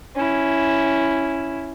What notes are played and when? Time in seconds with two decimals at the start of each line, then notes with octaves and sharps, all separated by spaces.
0.15 C#4 E4